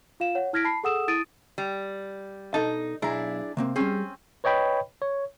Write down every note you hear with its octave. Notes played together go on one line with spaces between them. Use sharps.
F4 F5 E7
C#5 F#5
E4 F6 G#6 A#6 B6 D7
A5 B5 C7
G#4 A4 F#5 D#6 E6 E7
E4 D#6 A6 D7 D#7
G3
B2 D#4 A4 A5
B1 D4 E4 G#4 A#5
C3 A#3 C4
G3 C4 C#4 G#4
B4 C#5 D#5 G5 B5
C#5